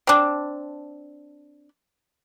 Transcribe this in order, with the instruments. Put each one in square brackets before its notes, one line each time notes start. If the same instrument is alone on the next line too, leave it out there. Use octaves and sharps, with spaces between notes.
[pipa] C4 D4